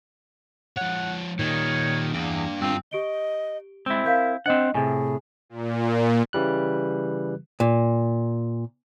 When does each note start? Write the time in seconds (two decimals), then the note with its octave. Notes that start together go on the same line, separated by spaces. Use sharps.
0.77 F3 C#5 F#5
1.39 A#2 D#3 G3 C#5
2.14 E2 A#3 D4 G5
2.61 G2 C4 F4
2.91 G4 D#5 D7 G7
3.86 G#3 C4 E4
4.05 A#4 F5 G6 B6
4.46 C4 D4 C5 D#5 F#5
4.74 A2 C3 G#4 G#5
5.49 A#2
6.33 C#3 E3 G3 F#6
7.60 A#2